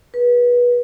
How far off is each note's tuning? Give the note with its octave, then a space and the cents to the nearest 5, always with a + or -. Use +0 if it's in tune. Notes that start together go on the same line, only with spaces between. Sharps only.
G#4 +0 B4 -25